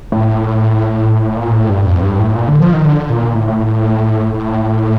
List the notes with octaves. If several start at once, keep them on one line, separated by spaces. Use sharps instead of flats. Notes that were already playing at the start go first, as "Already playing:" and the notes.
A2
A#2
A2
G2
F2
G2
A2
A#2
D3
F3
D#3
D3
A#2
A2
A2